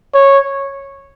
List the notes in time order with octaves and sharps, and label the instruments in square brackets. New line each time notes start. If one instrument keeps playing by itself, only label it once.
[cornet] C#5